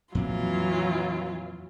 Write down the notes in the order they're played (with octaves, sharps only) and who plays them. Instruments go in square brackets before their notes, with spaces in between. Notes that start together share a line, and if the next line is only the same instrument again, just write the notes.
[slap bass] F2 A#2 C4 [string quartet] E3 F#3 F4